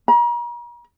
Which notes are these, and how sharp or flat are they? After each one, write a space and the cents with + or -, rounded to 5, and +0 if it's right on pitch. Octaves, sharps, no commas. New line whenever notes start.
A#5 +40